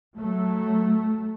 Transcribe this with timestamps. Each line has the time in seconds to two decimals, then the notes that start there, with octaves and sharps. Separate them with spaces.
0.17 F#3 A3